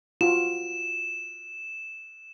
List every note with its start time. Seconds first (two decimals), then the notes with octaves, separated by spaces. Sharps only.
0.21 F4 F#4 E7